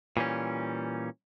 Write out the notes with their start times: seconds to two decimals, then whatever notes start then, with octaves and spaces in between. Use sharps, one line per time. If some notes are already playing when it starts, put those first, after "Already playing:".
0.17 A#2 E3 G3 C#4